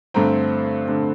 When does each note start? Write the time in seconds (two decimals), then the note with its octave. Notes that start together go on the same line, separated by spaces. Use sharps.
0.14 G2 D3 A3 C4 A#5
0.86 D3 A3 C4